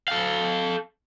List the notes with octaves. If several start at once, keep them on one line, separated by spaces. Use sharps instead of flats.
A4 F5